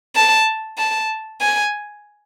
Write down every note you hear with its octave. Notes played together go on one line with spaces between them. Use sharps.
A5
A5
G#5